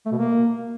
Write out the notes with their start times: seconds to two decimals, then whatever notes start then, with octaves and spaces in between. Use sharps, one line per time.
0.06 A3
0.12 B2
0.18 A#3